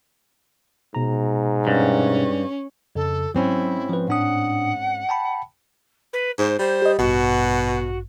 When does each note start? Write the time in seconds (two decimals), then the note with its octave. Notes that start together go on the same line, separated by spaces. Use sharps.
0.95 G#2 B2 A#5
1.67 G2 C#4
2.95 F2 C#3 A4
3.35 G#2 F#3 C4 C#4 E4
3.89 F3 B4
4.08 A2 D4 F#5 D#6
5.09 G5 A5 B5
6.13 B4
6.39 G#2 C5
6.59 G3 C5
6.82 G4 D#5
6.99 A1 G2 B2 F#4